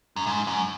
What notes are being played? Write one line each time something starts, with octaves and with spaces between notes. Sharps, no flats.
F#2
G#2
F#2